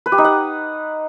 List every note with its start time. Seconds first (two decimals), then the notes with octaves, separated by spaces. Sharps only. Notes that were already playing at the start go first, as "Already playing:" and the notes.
0.06 B4
0.12 G4
0.18 D#4
0.24 F#5